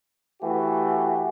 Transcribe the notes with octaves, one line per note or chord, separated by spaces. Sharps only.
E3 A3 F#4 G4